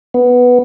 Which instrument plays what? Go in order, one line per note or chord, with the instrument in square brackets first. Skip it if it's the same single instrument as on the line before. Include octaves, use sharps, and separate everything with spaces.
[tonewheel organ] B3